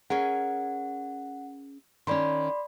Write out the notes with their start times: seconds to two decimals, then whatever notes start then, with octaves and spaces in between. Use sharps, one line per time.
0.10 C#4 G#4 A#4 F#5
2.07 D#3 C#4 D5 B5 C6